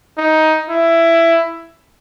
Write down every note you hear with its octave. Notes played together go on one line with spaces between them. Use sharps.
D#4
E4